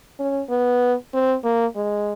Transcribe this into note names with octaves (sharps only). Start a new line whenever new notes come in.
C#4
B3
C4
A#3
G#3